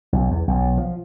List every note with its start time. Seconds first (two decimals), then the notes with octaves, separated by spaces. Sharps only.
0.13 B1
0.31 E2
0.48 B1
0.78 F3